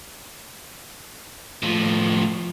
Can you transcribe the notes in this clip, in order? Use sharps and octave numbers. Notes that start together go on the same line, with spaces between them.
A2 F3